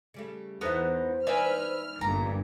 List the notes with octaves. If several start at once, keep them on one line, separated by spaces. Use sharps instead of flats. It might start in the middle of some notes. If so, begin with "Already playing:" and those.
C#3 G3 A3
E2 B3 D#4 A4 C5 E5 F#5
D#4 B4 D5 E5 G#5 F6
G1 G2 A#2 A#5